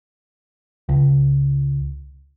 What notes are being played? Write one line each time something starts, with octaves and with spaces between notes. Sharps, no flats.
C#2